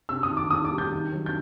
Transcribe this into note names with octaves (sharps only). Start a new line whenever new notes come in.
C3 E6
D#6
D#3
D6
E2 D#6
D6
G3
G6
D#3
F#3
G6